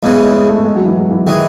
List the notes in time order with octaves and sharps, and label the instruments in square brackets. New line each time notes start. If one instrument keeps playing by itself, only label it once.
[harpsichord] E2 C#3 E3 [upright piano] G#3
[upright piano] G#3
G#3
A3
G#3
F#3
E3
F#3
E3
[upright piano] D#3 [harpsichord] E3 G#3